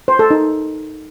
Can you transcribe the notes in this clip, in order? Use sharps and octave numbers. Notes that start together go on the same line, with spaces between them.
C5
A4
D#4